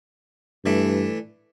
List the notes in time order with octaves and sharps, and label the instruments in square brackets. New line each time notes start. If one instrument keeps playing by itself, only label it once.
[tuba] G2 [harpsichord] E3 A3 D4